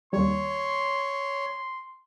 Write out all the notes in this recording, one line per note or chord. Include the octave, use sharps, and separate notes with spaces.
D#2 G3 C#5 C6